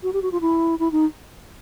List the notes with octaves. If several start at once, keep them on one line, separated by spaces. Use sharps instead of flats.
F#4
G4
F#4
F4
E4
E4
D#4